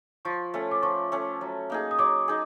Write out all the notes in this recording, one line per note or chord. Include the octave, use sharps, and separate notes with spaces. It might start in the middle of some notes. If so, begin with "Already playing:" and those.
F3 C#6
A3 C#4
D6
F3 C#6
A3 C#4
F#3
A#3 D#4 G#4
D#6
F#3 D6
D#4 G#4